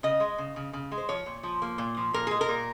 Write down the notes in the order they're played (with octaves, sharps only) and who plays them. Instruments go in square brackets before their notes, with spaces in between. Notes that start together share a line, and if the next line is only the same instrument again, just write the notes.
[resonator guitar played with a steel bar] C#3 D#5
G#3
C#3
C#3
C#3
G#3
C5
F3 C#5
A#2
F3
A#3
A#2
F3
A#2 A#4
G#3 G#4
A#4
A#2